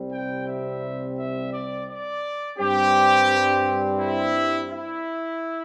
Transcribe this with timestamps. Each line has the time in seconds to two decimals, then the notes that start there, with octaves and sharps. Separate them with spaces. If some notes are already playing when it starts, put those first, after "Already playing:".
Already playing: C2 C3 G3 C4
0.12 G5
0.47 E5
1.17 E5
1.52 D5
1.88 D5
2.59 G2 G3 C4 G4
3.99 E4
4.70 E4